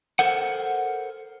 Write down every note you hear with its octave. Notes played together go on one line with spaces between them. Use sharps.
A4 A#4 C5 F#5